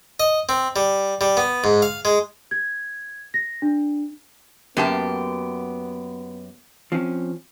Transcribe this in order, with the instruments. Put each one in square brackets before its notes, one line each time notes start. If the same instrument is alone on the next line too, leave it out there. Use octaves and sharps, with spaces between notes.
[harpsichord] D#5
C4
G3
G3
B3
G#2
F5
G#3
[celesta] G#6
A#6
D4
[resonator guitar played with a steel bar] F#2 G4 A5 [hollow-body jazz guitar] A#3 [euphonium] B3
[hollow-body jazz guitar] F3 C4 C#4